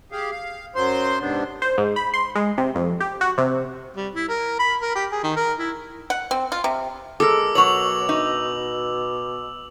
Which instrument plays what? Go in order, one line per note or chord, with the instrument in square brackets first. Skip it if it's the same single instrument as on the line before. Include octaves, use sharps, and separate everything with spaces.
[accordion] G4 G#4 F5
F5
F#2 F#3 C5 C6
G#2 C3 B3 D4
[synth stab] C5
G#2
B5
C6
G#3
C3
F2
G4
F#4
C3
[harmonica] G3
E4
A#4
B5
A#4
G4
G#4
D#3
A#4
E4
[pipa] F#5
C4
F4
C3
[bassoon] G#3 [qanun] A4 A#4 [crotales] D6 E6
[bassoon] B2 [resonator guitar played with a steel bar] F#3 C#5 [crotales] F7 F#7
[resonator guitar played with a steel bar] D#4